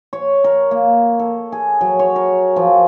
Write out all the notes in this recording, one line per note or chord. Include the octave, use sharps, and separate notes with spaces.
C#5
A#4
A#3
A4
G#4
F#3
C#5
A#4
F3